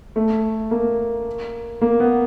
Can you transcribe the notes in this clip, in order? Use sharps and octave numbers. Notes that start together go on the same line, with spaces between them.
A3
A#3
A#3
B3